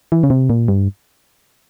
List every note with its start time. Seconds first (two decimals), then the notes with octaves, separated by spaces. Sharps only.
0.12 E3
0.23 C#3
0.30 C3
0.50 A#2
0.68 G2